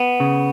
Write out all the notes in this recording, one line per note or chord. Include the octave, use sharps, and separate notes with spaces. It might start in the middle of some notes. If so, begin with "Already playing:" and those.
Already playing: B3
C#3